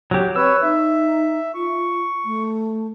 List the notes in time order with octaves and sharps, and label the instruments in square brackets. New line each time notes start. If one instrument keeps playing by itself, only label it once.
[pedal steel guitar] F#3 G4
[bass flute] C4 [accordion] B4 C#5 [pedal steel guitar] E6
[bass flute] D#4 [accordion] E5
[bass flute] F4 [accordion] C#6
[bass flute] A3